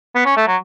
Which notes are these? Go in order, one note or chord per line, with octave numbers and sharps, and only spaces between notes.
B3
C#4
A3
F#3